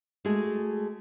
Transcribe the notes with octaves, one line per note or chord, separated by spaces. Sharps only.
G#3 A3 F#4 G#4